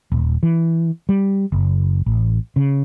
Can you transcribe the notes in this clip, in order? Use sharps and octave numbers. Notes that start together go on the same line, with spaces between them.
D#1
E3
G3
F#1
A1
C#3